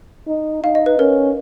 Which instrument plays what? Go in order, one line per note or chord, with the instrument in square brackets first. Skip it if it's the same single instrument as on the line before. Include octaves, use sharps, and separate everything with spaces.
[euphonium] D#4
[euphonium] D#4 [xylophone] F5
[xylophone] D#5
B4
[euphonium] C#4 [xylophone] A#4